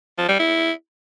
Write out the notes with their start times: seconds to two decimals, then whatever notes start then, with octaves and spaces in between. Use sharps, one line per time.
0.18 F3
0.29 G3
0.39 E4